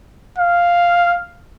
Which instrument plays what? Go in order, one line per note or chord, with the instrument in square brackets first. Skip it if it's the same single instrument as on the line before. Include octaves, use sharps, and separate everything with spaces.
[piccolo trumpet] F5